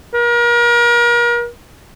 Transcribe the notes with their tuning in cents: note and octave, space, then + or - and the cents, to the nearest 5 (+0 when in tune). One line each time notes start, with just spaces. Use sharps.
A#4 +35